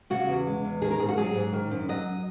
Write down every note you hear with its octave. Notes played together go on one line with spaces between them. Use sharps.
C#3 F#4
E2
G#3
E2
D#3 G#4
A#4
G#2 G#4
F#4
F#3 G#4
G#2
D#3
F#2
F#3 D#5